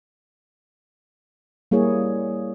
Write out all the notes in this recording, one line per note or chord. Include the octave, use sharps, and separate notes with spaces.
G3 A#3 E4 G#4 C#5